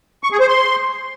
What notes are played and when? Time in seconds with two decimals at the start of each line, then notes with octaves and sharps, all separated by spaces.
0.23 C#6
0.32 G#4
0.40 C5
0.48 C6